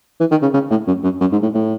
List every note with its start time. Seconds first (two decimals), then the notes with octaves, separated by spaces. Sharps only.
0.20 E3
0.31 D#3
0.42 C#3
0.54 C#3
0.70 A2
0.87 F#2
1.04 F#2
1.21 F#2
1.32 G#2
1.43 A2
1.54 A2